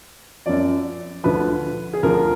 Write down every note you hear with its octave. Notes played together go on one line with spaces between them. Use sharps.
F#2 F3 D5
D2 D3 F3 B4
G#4
D2 D3 F3 A#4